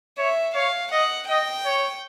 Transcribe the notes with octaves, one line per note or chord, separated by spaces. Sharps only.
C#5 E5
C#5 F5
D#5 F#5
D#5 G5
C#5